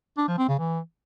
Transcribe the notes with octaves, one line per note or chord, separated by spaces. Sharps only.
D4
F3
C4
C#3
E3